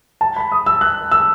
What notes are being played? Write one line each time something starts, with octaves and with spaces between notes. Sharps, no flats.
A5
B5
D#6
E6
F#6
E6